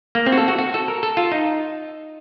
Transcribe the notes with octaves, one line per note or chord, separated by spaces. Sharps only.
A#3
C4
F#4
A4
F#4
F#4
A4
A#4
A4
F4
D#4